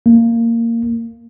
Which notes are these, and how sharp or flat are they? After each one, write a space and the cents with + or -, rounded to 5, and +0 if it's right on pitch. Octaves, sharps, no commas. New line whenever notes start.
A#3 -15